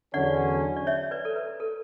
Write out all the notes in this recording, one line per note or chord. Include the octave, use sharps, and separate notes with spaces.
E2 D3 F#3 C#4 D5 F#5
D5
C#5 E5
B4 D5
A4
B4
A4